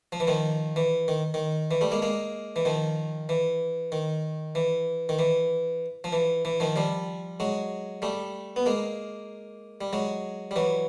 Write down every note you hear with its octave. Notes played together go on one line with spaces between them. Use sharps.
F3
E3
D#3 F3
E3
D#3
D#3
E3
G3 A3
G#3 A#3
G#3 A#3
E3
D#3 F3
E3
D#3
E3
D#3
E3
F3
E3
E3
D#3 F3
F3 G3
F#3 G#3
G3 A3
B3
G#3 A#3
G3
F#3 G#3
G3
E3 F#3